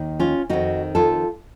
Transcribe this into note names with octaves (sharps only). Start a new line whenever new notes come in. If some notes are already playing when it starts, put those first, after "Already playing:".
Already playing: D#2 D#3
C#4 F4
F2 D#3 D#4 F#4
F4 A4